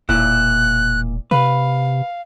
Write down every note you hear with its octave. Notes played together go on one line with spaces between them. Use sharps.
E1 A#2 E4 F#6
C3 B4 F5